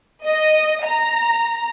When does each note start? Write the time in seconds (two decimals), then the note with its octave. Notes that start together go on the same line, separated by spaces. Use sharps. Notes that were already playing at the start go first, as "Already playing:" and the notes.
0.25 D#5
0.84 A#5